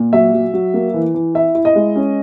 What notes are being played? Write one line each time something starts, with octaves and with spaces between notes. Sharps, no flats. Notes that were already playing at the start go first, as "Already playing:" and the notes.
Already playing: A#2
F#3 E5
F#3
F#3
A#3
E3
E3
E4 E5
E4
D#5
G#3
C#4